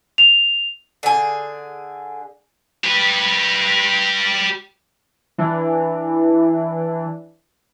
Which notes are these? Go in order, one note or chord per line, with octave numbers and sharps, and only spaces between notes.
F7
D3 G#4
G4 B4
E3 D4